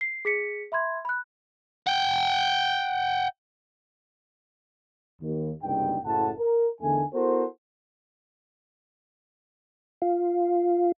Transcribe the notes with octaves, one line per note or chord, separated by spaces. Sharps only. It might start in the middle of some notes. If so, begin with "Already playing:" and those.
C7
G#4 B6 C#7
E5 B5 C6 G#6
B5 F#6
F#5 G5
D#2
F#1 C2 G2 G#3 D#4 G5
F#1 A2 F#5 A5
A#4
E2 D3 D#3 A3 A4 G#5
B3 E4 F#4 A4 A#4 C5
F4